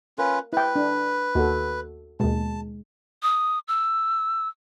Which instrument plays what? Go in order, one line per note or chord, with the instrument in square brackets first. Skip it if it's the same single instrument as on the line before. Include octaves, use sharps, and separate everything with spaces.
[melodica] C#4 F4 B4 [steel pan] A#4
[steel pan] E4 G5 [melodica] B4
[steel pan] D4
[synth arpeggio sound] D#2 [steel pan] F#4 A4
[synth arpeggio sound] D#2 B2 [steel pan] G#3 [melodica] A5
[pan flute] D#6
E6